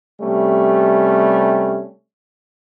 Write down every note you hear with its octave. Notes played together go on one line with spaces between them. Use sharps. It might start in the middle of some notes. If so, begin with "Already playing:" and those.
C3 G3 A3 C#4